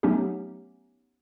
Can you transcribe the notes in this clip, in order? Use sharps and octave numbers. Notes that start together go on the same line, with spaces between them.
F#3 A3 B3 C#4 D#4 G4